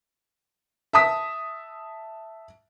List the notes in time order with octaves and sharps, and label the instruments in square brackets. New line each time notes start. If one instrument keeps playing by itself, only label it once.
[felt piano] E5 A5 D#6 B6